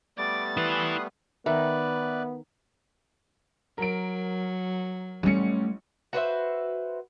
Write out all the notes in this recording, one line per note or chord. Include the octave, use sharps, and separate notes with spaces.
G3 A3 B3 D5 D6 A6
E4 B4 C6 D#6 F#6
D#3 B3 B4 D5 E5
F#3 A#4 D7
A1 G3 A3 C#4 C#7
F#4 B4 C5 E5